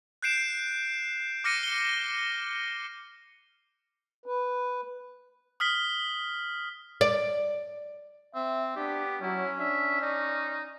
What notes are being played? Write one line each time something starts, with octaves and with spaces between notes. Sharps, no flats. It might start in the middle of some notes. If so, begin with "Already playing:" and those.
F#6 G6 C7 D7 E7
D6 F6 A#6 C#7 D#7
G7
B4
D#6 F6 B6 G7
D5
C4 E5
B3 D4 G4
F#3 C#4 E4
D4 E5
D#4 D5